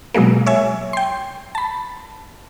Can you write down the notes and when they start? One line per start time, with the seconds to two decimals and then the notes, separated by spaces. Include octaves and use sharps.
0.14 B2 F#3 G#3 A#3
0.46 C#5 E5 G#5
0.93 G5 C6
1.55 A5 B5